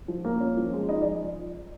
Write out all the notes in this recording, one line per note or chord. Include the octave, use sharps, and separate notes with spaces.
F3
A#3
C#4
F3
G#3
D#4 D#5
D5
F3